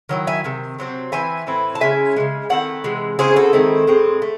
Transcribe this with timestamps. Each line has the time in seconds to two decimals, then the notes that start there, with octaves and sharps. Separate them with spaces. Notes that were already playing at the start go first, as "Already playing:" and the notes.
0.09 D#3 F#3 E4
0.27 E5 G#5
0.44 C3 D#3
0.79 C3 F#3 C4
1.12 E3 C4 E4 E5 G#5
1.47 A2 E3 C4 E4
1.75 A5
1.81 C#3 G#3 C#4 E4 E5 G#5
2.16 C#3 E3 G#3
2.50 D#3 A3 C4 E4 F#5
2.84 C3 E3 G#3
3.19 C#3 G#3 C4 E4 G#4 C5
3.36 F#4 A4
3.53 D#3 G#3 C4 E4
3.87 A2 G#3 C4
4.22 A3